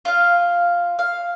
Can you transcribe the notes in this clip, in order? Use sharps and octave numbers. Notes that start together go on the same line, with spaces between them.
F4 F5
F5